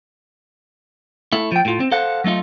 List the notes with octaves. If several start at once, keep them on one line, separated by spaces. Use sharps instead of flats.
A3 E4
F3 G5
A2 F4
C4
A4 C5 F5 F#5
F#3 A3 D#4 F4